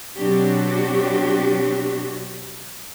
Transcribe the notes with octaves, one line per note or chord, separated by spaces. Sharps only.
B2 F#3 C4 D4 F#4 G4